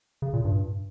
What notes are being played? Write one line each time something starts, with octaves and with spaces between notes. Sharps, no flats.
C#3
A#2
G2